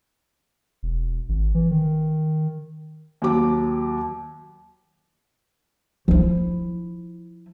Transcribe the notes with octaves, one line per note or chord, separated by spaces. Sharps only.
E1
G#1
E3
D#3
D#2 F#3 D6
F3 E4